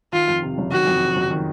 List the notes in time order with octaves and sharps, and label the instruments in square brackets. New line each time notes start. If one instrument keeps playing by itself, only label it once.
[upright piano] D#3 [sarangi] F4
[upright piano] F2
C3
F#1
[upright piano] D#3 [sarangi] F#4
[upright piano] F2
C3
F#1
D#3